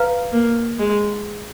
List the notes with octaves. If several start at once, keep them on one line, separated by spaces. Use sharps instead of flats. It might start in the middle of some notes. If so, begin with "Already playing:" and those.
Already playing: B4 F5 A#5 F6
A#3
G#3